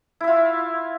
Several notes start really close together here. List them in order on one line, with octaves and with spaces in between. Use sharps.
E4 E5 F4